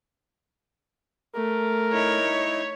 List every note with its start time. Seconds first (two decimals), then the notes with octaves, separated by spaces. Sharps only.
1.35 A3 A#4
1.93 D#4 E4 C#5